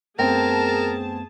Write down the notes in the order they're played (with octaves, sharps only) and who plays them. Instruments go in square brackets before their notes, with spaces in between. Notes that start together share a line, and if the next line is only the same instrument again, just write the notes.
[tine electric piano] F#2 A3 B3 [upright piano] C4 G5 [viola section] G#4 A5 [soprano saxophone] A#4